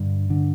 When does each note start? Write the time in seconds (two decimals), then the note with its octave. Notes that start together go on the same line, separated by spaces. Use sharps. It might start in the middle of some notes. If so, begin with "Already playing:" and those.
Already playing: G2 D3
0.30 D3